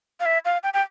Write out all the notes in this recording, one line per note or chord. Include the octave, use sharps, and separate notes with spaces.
F5
E5
F5
G5
G5